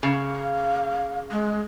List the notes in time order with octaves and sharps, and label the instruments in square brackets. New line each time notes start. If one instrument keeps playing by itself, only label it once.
[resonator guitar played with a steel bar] C#3 [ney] F5
[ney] G#3